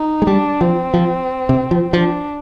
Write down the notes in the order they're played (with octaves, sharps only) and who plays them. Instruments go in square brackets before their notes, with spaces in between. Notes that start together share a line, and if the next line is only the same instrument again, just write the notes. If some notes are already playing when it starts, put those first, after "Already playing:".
Already playing: [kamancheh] D#4
[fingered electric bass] G#3
[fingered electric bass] G3 [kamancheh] D4
[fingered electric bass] F3 [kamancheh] C4
[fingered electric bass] F3
C3
F3
[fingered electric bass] F3 [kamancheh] D4